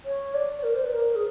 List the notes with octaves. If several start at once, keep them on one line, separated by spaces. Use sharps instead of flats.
C#5
D5
A#4
C5
B4
A#4
G#4